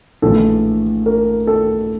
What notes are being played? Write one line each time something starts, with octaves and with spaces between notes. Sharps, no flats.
A#1 A2 E3 A3 A4
A#4
A4